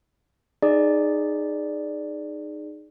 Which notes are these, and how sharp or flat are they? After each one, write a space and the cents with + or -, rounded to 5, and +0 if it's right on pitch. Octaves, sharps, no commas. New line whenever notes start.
D#4 -20 G#4 +5 D5 +0